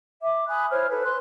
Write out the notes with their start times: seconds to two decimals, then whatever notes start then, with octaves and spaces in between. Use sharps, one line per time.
0.21 E5 D6
0.48 G#5 B5 D#6 F#6
0.70 E4 C5 C#5 F6
0.90 E4 A4 B4
1.03 C6 F#6